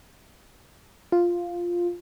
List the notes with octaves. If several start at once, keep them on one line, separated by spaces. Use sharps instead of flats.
F4